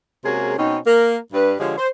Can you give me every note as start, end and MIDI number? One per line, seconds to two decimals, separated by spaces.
0.24 0.53 48
0.24 0.53 56
0.24 0.53 58
0.24 0.53 61
0.24 0.53 66
0.24 0.53 68
0.57 0.77 47
0.57 0.77 60
0.57 0.77 61
0.57 0.77 63
0.85 1.17 58
0.85 1.17 70
1.33 1.54 43
1.33 1.54 71
1.58 1.73 50
1.58 1.73 53
1.58 1.73 56
1.58 1.73 67
1.58 1.73 72
1.58 1.73 73
1.77 1.88 72